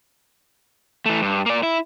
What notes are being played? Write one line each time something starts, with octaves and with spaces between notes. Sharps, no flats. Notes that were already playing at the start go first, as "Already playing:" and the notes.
E3 A3
G2
A#3 D5
E4